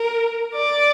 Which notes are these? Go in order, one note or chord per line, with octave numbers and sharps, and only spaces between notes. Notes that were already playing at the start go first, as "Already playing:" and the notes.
Already playing: A#4
D5